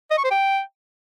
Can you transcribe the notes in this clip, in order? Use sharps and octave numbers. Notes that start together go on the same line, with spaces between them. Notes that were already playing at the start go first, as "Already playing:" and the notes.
D#5
C#6
C5
G5